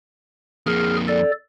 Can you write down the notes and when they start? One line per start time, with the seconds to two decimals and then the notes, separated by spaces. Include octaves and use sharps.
0.67 F2 A#3 G#4 F6
1.08 A4 D5